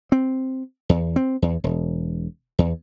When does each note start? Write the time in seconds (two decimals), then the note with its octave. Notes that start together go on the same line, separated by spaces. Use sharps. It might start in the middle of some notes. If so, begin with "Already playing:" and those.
0.12 C4
0.89 E2
1.16 C4
1.42 E2
1.64 E1
2.59 E2